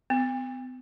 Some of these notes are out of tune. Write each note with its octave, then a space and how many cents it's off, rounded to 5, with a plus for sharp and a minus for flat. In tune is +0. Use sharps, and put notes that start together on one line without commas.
B3 +45